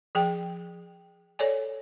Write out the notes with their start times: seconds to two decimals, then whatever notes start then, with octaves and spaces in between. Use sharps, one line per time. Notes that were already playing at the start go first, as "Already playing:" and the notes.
0.15 F3 G#4 G5
1.39 A4 C#5 D5 G#5